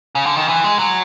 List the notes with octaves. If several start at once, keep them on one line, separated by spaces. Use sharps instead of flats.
C#3
D3
D#3
E3
G#3
F#3